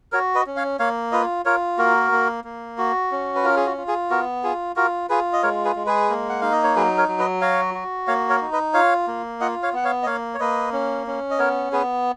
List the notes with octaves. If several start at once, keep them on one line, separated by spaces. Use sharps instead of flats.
F#4 A#4 C#5
B4 D#5
C#4
C#5 F5
A#3 C#5 F5
F4 B4 D#5
F4 A#4 C#5
A#3 F#4 A#4
A#3
A#3
F#4
C#4
B4
F4 A#4
G#4
F#4
F4
G#4
B3 F#4 A#4
F4 G#4
F4 F#4 A#4
F4 G#4 B4
D#5
G#3 A#4 C#5
G#4 B4
G#3
G#4 B4
A#3
F#5
D#4 F5
D#5
C#5
F#3 G#4 B4
A#4 C#5
F#3
B4 D#5
F#4 C#5 F5
F#4
A#3 C#5 F5
A#4 C#5
D#4
B4 D#5
F4 C#5 F5
A#3
F4 D#5 F#5
C#5 F5
B3 F#5
C#5 F5
D#5
A#3 C#5 F5
C#5
A#3 B4 D#5
C#4
C#4
D#5
B3 A#4 C#5
B3 G#4 B4